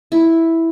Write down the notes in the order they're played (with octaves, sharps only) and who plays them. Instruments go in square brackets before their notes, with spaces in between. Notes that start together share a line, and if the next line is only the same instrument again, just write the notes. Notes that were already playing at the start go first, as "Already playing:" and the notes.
[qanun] E4